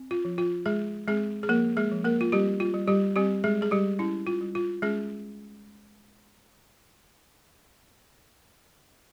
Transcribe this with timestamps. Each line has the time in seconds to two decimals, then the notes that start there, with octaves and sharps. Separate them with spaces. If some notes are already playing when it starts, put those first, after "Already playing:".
Already playing: C4
0.11 F4
0.25 F3
0.38 F4
0.66 G#3 G#4
1.08 G#3 C4 G#4
1.43 G#4
1.49 F3 A#3 A#4
1.77 G#3 G#4
1.91 F3
2.04 A#3 A#4
2.21 F4
2.32 G3 C4 G4
2.60 F4
2.74 G3
2.88 G3 G4
3.16 G3 C4 G4
3.44 G#3 G#4
3.58 G3 G#4
3.71 G3 G4
3.99 C#4 E4
4.27 F4
4.41 G3
4.55 F4
4.82 G#3 C#4 G#4